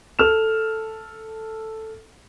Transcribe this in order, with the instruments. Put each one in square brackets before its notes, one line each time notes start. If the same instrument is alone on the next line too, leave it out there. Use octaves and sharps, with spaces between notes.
[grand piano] A4 F6 E7